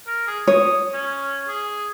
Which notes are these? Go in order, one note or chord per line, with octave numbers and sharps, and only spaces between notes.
A#4
G#4
C#5 D#6
C#4
G#4